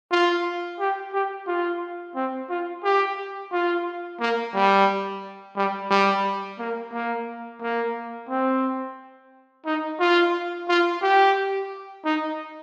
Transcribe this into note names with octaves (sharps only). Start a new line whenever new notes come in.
F4
G4
G4
F4
C4
F4
G4
F4
A#3
G3
G3
G3
A#3
A#3
A#3
C4
D#4
F4
F4
G4
D#4